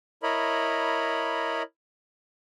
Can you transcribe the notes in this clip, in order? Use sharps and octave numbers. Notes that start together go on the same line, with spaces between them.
E4 A#4 C#5 D#5 B5